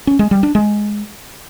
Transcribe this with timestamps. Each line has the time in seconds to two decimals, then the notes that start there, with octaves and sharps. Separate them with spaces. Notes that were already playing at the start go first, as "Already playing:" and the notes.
0.07 C#4
0.19 G#3
0.31 G3
0.43 D4
0.55 G#3